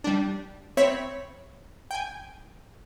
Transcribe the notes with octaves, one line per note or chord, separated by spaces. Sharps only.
G3 D4
C4 C#5 E5 B5
G5 G#5